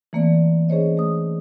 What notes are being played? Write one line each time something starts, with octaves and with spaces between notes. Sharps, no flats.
E3 A3 A#3 C4 D5
C#4 G#4 C5 C#5 D#5
A3 D#6